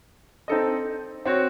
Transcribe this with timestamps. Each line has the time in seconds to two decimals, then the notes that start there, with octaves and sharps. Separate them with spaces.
0.48 C4 D#4 A4 D#5
1.26 C4 F#4 C#5